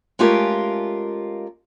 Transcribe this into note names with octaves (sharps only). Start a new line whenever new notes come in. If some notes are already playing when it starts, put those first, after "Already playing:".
G#3 A3 C#4 F4 G4 A#4